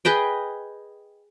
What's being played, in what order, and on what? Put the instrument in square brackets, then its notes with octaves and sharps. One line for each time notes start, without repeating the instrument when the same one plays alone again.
[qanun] G#4 B4 D#5 G5